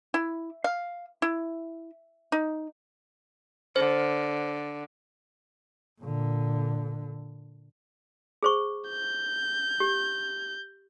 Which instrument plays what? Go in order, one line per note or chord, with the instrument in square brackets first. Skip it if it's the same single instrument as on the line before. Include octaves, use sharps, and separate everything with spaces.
[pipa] E4
F5
E4
D#4
[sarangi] D3 [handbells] C5
[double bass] A#2 D3
[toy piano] G#4 C5 C#6
[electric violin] G6
[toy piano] G4